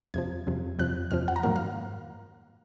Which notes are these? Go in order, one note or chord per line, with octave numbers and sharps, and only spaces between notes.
F2 C3 F3 G#6
F2 C3 F3
F2 C3 F3 F#6
F2 C3 F3 F6
F#5
A#5
G#2 D#3 F#3 A#3 F5
F5